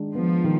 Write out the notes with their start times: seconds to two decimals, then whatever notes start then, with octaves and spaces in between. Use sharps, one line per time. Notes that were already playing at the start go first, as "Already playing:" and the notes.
Already playing: D#3 G#3 D4
0.15 F3 B3
0.44 D#3